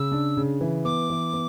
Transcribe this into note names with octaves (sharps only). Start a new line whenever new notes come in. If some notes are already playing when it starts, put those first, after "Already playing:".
Already playing: C#3 E6
D4
C#3
E3
B3 D6
E3
B3